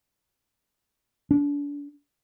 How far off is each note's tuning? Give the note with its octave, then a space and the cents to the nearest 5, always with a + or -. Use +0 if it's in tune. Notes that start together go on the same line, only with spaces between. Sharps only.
D4 -35